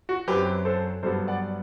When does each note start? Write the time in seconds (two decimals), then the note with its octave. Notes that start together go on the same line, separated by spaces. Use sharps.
0.09 F#4
0.28 F#2 F#3 C4 G4 B4
0.65 A4 C5
1.03 G2 F#3 B3 A4 C5
1.28 D5 F#5